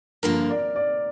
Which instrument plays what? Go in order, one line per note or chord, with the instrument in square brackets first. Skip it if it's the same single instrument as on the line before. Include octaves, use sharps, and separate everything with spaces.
[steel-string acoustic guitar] G2 D3 F3 A#3 [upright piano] A#4
[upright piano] D5
D5